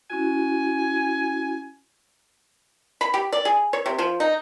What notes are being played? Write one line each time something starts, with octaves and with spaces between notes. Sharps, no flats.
C#4 E4 F#4 G#5
B5
G4
D5
G#4
C#5
C3
F3
D#4